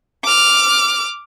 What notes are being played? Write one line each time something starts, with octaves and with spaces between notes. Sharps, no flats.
D6 F6